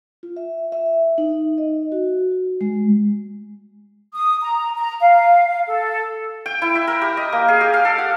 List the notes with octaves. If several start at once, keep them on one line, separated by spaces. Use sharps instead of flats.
F4
E5
E5
D#4
D#5
F#4
F#4
G#3
D#6
A#5
A#5
F5
A4
G5
E4
E5
A#4
G4
D#5
A#3
G#4
G4
F5
A4
F#5